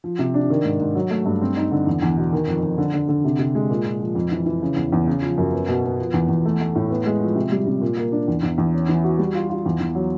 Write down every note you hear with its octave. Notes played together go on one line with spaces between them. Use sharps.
F3
C3
D4
D#3
G#2
G#2
F#3
A3
G2
C4
D#4
D3
E2
E2
B2
D#3
F2
F2
D3
D3
D3
C3
C3
G#3
A#2
A#2
F3
F2
E3
E3
C#3
E2
E2
C#3
F3
F#2
B3
B2
B3
F3
E2
E2
A3
A3
A2
B3
G#3
F3
C3
G3
C3
A#2
A#3
D4
E2
E2
E2
C#4
E3
F#4
G3
F4
F4
E2
E2
F#3